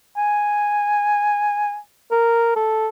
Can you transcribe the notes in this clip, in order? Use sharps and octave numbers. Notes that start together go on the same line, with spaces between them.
G#5
A#4
A4